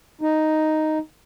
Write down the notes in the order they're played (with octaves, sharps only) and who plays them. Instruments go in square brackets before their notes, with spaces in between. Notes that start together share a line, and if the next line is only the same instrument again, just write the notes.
[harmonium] D#4